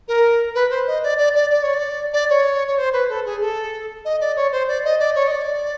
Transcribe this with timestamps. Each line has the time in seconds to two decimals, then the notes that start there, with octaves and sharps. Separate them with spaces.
0.08 A#4
0.55 B4
0.71 C5
0.87 D#5
1.03 D5
1.18 D5
1.35 D5
1.50 D5
1.63 C#5
1.74 D5
2.13 D5
2.30 C#5
2.67 C#5
2.78 C5
2.93 B4
3.09 A4
3.26 G#4
3.41 A4
4.05 D#5
4.21 D5
4.36 C#5
4.52 C5
4.68 D5
4.84 D#5
5.00 D5
5.15 C#5
5.27 D#5
5.32 D5